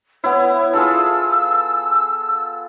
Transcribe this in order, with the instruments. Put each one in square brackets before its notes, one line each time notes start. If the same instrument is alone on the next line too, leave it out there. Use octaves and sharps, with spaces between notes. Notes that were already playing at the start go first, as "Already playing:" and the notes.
[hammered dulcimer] B3 E4 [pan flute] C#5
[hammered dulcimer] F4 G#4 A4 [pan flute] E6